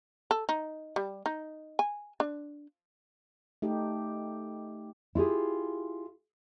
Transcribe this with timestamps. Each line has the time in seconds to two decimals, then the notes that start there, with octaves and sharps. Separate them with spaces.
0.31 A4
0.49 D#4
0.96 G3
1.26 D#4
1.79 G#5
2.20 D4
3.62 A3 D#4 G4
5.15 E4 F4 G4 G#4